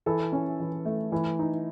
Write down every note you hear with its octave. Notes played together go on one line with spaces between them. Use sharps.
E3 A4
C#4
E3
A3
E3
D#4